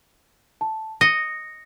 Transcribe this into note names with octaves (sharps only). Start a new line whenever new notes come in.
A5
D#5 A#6 C#7